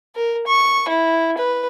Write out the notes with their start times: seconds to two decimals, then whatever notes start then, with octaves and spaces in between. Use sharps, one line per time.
0.15 A#4
0.47 C#6
0.88 E4
1.38 B4